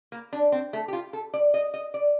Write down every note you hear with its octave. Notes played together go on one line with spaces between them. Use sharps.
A#3
D4
C4
A3
G4
F4
A4
D5
D#5
D#5
D5